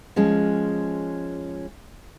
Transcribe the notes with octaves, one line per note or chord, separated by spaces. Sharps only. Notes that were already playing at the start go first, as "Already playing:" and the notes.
F3 G#3 C#4